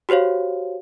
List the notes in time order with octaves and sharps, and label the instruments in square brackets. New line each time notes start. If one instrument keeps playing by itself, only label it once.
[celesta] F#4 G4 C5 C#5 F5